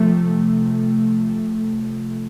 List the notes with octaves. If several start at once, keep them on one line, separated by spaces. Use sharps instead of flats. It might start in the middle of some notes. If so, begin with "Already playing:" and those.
Already playing: C3 F3 A3